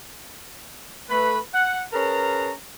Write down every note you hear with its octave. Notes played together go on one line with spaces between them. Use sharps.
A3 B4 B5
F#5
C#4 G#4 A#4 B4 A5 A#5